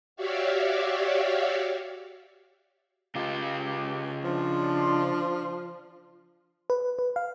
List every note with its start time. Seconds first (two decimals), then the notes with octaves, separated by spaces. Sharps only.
0.16 F#4 G4 C#5 D5 E5 F5
3.15 C#3 F4 G4
4.24 F3 D4 C6
6.70 B4
6.99 B4
7.16 F5